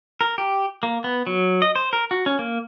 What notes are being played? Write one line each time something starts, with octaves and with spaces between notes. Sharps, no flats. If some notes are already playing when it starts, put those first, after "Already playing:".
A#4
G4
A#3
B3
F#3
D#5
C5
A#4
F#4
C#4
A#3